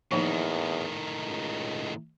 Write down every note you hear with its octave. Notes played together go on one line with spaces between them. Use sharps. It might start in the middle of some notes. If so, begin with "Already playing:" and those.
E2 A2 D#3 F3 A#3 D#4
C#2